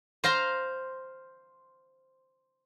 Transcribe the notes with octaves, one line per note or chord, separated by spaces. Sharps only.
C5 F5 A#5 C6